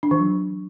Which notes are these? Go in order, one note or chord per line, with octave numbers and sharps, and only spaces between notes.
D4
E3
F#3